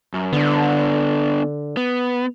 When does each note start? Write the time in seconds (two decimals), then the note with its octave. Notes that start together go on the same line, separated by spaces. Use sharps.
0.14 F#2
0.33 D3 B3 D4
1.77 B3